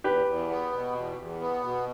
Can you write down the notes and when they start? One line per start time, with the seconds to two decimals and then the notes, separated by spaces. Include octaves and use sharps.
0.04 E2 G4 B4
0.26 E2
0.49 B3
0.72 B2
0.95 E2
1.18 E2
1.40 B3
1.63 B2